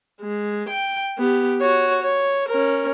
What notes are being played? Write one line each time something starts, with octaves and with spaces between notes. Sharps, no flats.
G#3
G5
B3 G4
F#4 C#5
C#5
C#4 A#4